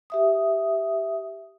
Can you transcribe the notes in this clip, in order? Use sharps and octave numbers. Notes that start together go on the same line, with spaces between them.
G4 E5 D#6